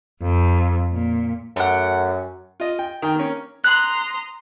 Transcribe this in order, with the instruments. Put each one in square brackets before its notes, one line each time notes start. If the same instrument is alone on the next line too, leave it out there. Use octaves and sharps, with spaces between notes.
[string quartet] F2
A#2
[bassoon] F#2 [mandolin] A3 G4 F#5
[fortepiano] F4 D#5
G5
D#3 G5
A#3 C#4
[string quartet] A#5 C6 D#6 [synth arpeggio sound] F#6